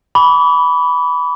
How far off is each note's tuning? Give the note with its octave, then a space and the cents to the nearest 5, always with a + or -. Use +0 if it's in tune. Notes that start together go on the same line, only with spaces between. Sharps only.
B5 +0 D6 -40